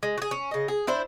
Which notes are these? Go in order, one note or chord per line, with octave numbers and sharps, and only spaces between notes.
G#3
F#4 G#4
C#4
C#3 D#5
G#4
D4 E4 C5